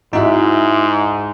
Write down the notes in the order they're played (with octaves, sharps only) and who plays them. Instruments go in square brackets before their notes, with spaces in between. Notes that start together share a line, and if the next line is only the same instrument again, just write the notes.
[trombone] G#2 [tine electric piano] D#4 [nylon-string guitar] E4 F#4 E5